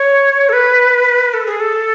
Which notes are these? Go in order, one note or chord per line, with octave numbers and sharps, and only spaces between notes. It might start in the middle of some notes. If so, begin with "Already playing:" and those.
Already playing: C#5
A4
B4
A4
G#4
A4